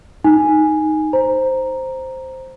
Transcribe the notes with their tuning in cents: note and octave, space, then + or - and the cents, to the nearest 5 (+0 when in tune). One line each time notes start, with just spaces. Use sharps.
D#4 +0 G#5 +0
C5 +0 A#5 +0